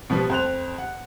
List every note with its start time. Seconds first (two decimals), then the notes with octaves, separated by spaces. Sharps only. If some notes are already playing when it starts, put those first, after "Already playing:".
0.10 B2 F3 G3 B3
0.30 F2 C5 F#6 F7
0.78 F#5